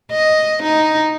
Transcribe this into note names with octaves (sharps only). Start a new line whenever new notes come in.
D#5
D#4